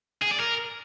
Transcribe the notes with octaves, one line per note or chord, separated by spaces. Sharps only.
G#4
D5
A#4